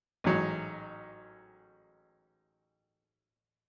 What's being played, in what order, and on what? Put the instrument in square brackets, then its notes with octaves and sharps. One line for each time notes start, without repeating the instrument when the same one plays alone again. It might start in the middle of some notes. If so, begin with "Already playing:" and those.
[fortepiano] A1 G#2 F#3